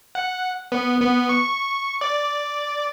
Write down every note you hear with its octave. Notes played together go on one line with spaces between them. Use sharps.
F#5
B3
B3
C#6
D5